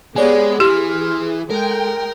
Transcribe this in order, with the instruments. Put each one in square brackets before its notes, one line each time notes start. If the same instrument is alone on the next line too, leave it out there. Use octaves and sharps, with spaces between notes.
[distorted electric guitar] G#3 [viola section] B3 G4 G#4 [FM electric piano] C#5 D5 G#5
[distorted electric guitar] E3 [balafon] G4 [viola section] G#4 [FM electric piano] C6 F6
[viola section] G#3 G5 [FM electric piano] A4 [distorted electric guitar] A#4